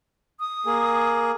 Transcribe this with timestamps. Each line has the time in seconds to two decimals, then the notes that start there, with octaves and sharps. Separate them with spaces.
0.40 D#6
0.66 A#3 G#4